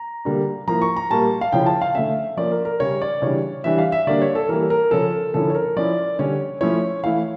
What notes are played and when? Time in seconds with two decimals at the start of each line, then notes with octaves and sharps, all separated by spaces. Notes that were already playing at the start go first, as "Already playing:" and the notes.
Already playing: A#5
0.25 D3 G3 A#3 D4
0.68 F3 A#3 E4 A#5
0.82 C#6
0.97 A#5
1.10 A#2 G3 A#3 A5
1.41 F5
1.52 C#3 F3 C#4 E4 G5
1.66 A5
1.82 F5
1.95 D3 A3 C#4 E5
2.37 F3 A#3 C#4 D5
2.52 A#4
2.65 A#4
2.80 C#3 G3 C#4 C#5
3.02 D5
3.22 C#3 E3 G3 D4 C#5
3.64 E3 G3 D4 E5
3.78 F5
3.92 E5
4.07 D3 G3 A#3 D4 D5
4.22 C#5
4.35 A4
4.49 E3 G3 A#3 A#4
4.70 A#4
4.91 C#3 F3 C#4 A4
5.34 D3 F3 C#4 E4 A4
5.50 C#5
5.55 A#4
5.76 F3 C#4 E4 D5
6.19 D3 G3 C#4 C#5
6.61 F3 A3 C#4 E4 C#5
7.03 E3 A3 E4 F5